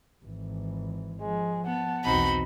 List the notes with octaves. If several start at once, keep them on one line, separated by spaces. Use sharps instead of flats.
G#1 E3
F3 G#3
B3 F#5 A5
B1 E2 C4 D#4 F#4 B5